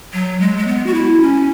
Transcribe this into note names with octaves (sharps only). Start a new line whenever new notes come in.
F#3
G#3
G#3
B3
F#4
E4
C#4